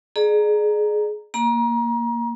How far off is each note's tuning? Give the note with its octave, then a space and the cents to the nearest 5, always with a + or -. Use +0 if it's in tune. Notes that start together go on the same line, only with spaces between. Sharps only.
G#4 +20 D5 +35 A#5 +0
A#3 +0 A#5 +30